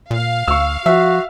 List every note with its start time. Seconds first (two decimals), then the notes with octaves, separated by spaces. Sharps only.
0.11 A#2 F5
0.48 D2 C#6 E6
0.86 F3 F#4 E5